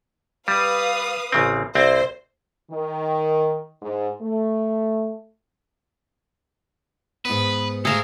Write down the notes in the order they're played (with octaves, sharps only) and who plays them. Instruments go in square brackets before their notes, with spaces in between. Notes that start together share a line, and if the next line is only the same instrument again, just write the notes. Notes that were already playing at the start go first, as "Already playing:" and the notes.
[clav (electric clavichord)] G3 [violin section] B4 F5 D#6
[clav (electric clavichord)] A1 C#3 C4
[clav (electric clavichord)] C2 C4 [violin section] C5
[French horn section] D#3
G#2
A3
[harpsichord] G#2 B3 [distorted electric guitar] B4
[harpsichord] G#2 A3 [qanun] G#4 F5 A5 [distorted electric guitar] A4 A#5